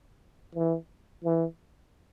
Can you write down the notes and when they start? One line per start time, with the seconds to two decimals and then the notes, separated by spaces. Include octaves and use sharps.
0.55 E3
1.24 E3